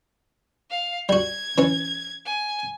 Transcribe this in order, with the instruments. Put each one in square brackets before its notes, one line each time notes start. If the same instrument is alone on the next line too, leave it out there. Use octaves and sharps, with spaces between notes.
[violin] F5
[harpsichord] G3 F#4 [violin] G#6
[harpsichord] E3 C#4
[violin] G#5